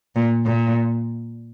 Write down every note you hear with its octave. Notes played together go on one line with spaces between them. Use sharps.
A#2
A#2